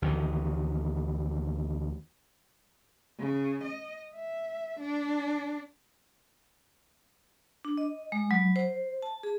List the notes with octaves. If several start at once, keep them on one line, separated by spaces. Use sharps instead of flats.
D2 D#3 E3
C#3
D#5
E5
D4
D4
D#5
G#3
F#3
C5
A5
G#4